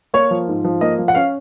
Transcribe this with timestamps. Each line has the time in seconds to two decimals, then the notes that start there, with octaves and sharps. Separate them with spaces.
0.13 A#3 C#5
0.31 F3
0.48 G#2
0.64 F3
0.81 A#3 D#5
0.98 F3
1.08 F#5
1.15 C#4 F5